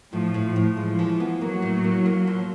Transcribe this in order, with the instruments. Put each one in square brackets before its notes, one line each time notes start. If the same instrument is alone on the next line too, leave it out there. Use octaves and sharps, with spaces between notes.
[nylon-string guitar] A2 [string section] F3
[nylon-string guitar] A2
[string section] F3
[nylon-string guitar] A2
[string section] F3 [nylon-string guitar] G#3
[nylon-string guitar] E3
B3
[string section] F#3 [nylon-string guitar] A#3
[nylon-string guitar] A2
A#3
A#3
F3